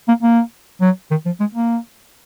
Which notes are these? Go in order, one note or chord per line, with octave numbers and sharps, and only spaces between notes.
A#3
A#3
F#3
D#3
F3
G#3
A#3